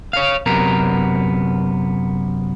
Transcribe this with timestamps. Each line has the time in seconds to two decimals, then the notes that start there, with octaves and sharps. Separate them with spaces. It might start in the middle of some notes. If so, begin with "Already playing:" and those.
0.13 C#5 F5
0.46 F#2 C3 B3 A#4